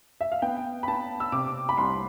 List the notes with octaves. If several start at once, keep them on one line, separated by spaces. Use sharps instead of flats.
E5
F5
B3 G5
B5
B3 A5
E6
C3 D6
B5
C2 C6